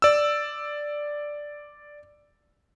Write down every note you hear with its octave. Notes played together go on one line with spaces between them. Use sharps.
D5 E6